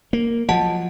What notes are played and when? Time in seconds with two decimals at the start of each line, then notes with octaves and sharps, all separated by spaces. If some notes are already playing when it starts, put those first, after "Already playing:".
0.13 A#3
0.49 F3 F#3 D#5 F#5 A5